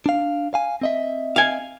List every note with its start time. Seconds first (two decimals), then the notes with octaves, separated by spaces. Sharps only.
0.06 D4 F5
0.54 F5 G#5
0.81 C4 D#5 E5
1.36 F5 G#5